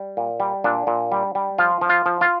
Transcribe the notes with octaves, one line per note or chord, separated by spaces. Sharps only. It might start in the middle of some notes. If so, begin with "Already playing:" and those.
Already playing: G3
A#2
G3
A#2 D4
A#2
G3
G3
F3 F4
F3
F4
F3
F4